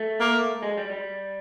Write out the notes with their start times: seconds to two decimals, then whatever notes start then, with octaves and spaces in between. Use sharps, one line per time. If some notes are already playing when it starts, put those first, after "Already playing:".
Already playing: A3
0.20 A#3
0.63 G#3
0.77 G3
0.91 G3